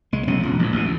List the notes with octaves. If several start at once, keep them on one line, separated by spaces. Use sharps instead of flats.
C2 G#3
F1 B1 B2 C#4
E1 C#2
A1 A2
A1 B2
D2